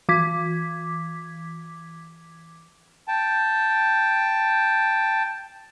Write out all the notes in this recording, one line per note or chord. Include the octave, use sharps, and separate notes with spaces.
E3 D6 G#6 B6
G5 A5